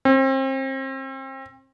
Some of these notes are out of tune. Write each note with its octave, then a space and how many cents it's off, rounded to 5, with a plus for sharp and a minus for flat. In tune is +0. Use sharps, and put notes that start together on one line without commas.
C4 +35